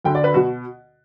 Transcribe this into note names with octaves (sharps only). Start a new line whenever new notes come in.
D2 D3 G5
D5
B4
B2 F#4